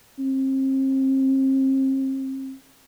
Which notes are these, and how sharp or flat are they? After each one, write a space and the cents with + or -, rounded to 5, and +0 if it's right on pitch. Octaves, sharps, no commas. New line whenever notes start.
C4 +35